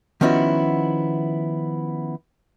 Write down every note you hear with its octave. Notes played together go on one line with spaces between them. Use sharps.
D#3 F3 B3 C#4 E4 F#4